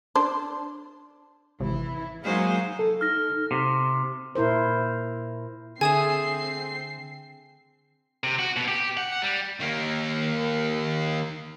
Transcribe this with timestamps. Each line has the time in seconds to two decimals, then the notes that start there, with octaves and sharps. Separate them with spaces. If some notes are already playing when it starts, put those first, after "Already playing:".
0.15 D4 C5
1.60 G#1 C3 E3 E4
2.23 F#3 G#3 A#3 D#4 G#4 C5 F5
2.79 A4
3.01 D#4 F6 A#6
3.51 C3
4.35 A#2 E4 A#4 C5
5.81 D3 A3 C4 G#4 G#5 D#6 C7 E7
8.24 C3
8.39 F#4
8.56 B2
8.68 G4
8.97 F#5
9.22 G3
9.60 D#3 A#3